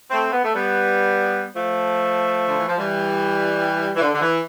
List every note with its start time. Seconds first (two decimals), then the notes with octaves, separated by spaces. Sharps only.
0.11 A3 C4
0.32 B3
0.44 A3
0.54 G3 B3
1.55 F3 A3
2.47 D3
2.57 E3
2.68 F3
2.78 E3 G3
3.96 E3
4.02 D3
4.13 D3
4.21 E3